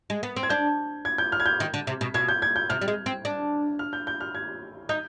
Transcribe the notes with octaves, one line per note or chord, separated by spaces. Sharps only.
G#3
B3
C4
G#6
D4 G6
G#6
G6
F6
G#6
G6
D#3
D3
C3
B2
B2 G#6
G6
G#6
G6
C3 F6
G3
G#3
C4
D4
F6
G6
G6
F6
G#6
D#4 G6